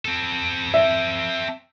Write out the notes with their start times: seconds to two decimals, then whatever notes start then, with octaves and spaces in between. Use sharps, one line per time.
0.05 C4 A4
0.74 E5